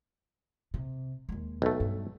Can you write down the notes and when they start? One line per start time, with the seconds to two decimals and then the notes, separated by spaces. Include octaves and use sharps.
0.74 C3
1.29 D#2 G#3
1.62 B1 A3
1.80 G2